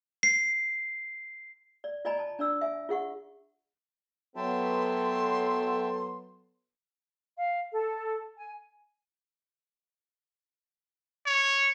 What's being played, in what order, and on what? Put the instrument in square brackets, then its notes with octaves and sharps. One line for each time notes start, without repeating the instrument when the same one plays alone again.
[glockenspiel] C7
[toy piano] D5
F4 D5 D#5 G#5 A#5 B5
A5
D4 D5 E6
E5 G#5
F4 G#4 F#5 C#6
[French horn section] F#3 B3 [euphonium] A4 [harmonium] E5 G5 A5 [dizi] C6
[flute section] F5
A4
G#5
[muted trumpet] C#5